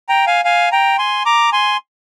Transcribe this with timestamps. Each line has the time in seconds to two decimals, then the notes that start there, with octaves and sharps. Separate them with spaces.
0.09 G5 A#5
0.27 F5 G#5
0.45 F5 G#5
0.72 G5 A#5
0.98 G#5 C6
1.25 A#5 D6
1.52 G#5 C6